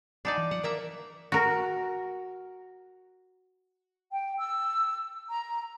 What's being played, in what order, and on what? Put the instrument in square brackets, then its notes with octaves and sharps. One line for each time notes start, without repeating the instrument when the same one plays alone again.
[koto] D4 D#4 D5 [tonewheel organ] F#5 G#5 B5
[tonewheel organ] E3
[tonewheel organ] F3 [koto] F#5
[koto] A#3 E5 A#5 [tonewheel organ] A#4
[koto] F#4 A#4
[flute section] G5
E6
A#5